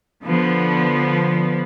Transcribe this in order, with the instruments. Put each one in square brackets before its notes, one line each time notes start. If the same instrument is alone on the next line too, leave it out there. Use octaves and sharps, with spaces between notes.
[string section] D3 F3 B3